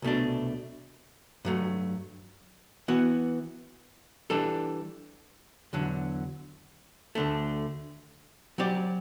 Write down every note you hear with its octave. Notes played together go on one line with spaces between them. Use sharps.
C2 B2 A3 D4
G2 F#3 A3
E3 B3 F#4
E3 G3 D4 A4
E2 D3 F#3
D2 D3 A3
F#3 C4 G4 D5